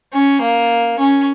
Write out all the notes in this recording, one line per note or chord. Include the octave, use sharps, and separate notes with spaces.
C#4
A#3
C#4